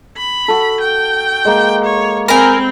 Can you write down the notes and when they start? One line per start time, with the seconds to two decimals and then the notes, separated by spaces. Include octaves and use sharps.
0.17 B5
0.48 F#4 A4
0.81 G5
1.45 G#3 A#3
1.85 C#5
2.28 C4 A#4 G#5 B5